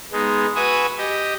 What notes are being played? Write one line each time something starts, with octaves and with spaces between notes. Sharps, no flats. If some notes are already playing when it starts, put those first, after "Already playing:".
G#3 B3 D#4
F#4 B4 E5 G#5 D#6
G4 D#5